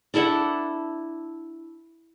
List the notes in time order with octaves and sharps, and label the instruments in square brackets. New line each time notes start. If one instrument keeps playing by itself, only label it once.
[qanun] D4 E4 A4 F#5